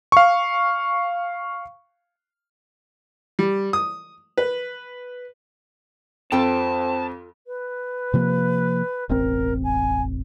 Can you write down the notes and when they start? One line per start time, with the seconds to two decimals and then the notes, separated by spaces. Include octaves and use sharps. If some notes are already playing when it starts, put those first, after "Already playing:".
0.12 F5 C#6
3.39 G3
3.73 D#6
4.38 B4
6.32 F2 C4 F4 A4 G5 A5
7.47 B4
8.14 C3 F3 A#3
9.09 E1 A1 C4 A#4
9.63 G#5